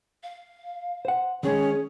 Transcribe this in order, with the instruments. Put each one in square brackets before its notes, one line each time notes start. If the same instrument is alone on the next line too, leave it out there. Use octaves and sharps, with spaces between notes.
[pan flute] F5
[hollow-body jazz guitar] C5 F#5
[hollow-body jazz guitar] D#3 G#3 [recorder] C#4 [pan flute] G#4